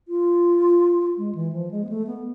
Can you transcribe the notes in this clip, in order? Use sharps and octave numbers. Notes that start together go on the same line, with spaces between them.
F4
G#3
E3
F3
G#3
B3
A3
B3